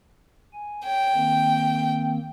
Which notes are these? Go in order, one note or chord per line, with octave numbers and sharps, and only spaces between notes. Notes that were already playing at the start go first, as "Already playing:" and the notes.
G#5
C#5 G5
D#3 A#3 C4